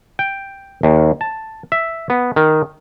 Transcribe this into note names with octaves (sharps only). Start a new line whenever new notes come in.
G5
D#2
A5
E5
B3
D#3